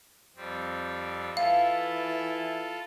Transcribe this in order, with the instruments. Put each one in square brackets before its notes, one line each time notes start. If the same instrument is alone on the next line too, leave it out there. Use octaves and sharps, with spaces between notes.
[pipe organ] F2 G3 C4
[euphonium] E3 [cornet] E4 [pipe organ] F4 A4 [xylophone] F5